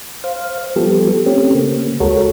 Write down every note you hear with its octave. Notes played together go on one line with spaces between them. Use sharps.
C5 F5
F3 G3 B3 G4 A4
A3 C4 C#4 G4
C#3 A#3
D2 G#3 F#4 A4 A#4 C#5